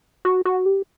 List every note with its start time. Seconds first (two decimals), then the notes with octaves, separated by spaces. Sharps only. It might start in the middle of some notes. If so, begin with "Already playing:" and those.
0.25 F#4
0.45 F#4
0.66 G4